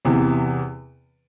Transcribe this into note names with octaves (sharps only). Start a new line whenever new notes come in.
E2 C3 E3